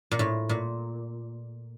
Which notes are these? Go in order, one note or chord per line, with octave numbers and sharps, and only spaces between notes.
A#2
A2
A#2